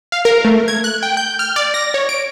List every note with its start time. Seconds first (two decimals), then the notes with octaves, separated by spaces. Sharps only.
0.12 F5
0.25 A#4
0.45 A3
0.68 G#6
0.84 F#6
1.03 G5
1.17 G6
1.39 F6
1.56 D5
1.74 A#6
1.94 C#5
2.09 D7